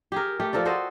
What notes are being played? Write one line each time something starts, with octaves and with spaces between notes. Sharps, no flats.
G4 G#4 A#4
A3 G4
F3 A4 A#4 D5
F#4 A4 C5 D#5